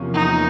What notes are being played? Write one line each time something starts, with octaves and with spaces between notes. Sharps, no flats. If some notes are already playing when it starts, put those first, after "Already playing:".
Already playing: E2 C3 F3 A#3 C#4
D#4